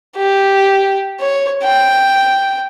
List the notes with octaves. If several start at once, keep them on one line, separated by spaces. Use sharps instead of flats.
G4
C#5
G5